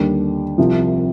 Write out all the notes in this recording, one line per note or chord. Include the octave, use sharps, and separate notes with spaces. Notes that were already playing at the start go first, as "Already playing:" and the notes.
Already playing: D#2 D3 G3
C2 C3 F3